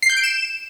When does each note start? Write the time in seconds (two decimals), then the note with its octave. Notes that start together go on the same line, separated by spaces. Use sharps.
0.03 C7
0.10 G6
0.17 D7
0.24 E7